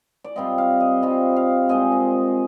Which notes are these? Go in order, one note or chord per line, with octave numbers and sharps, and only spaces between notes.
D5
C3 G3 C4 F4 D#5
F5
D#5
C3 G3 C4 F4 D#5
F5
A#2 G#3 C4 D#5
D#5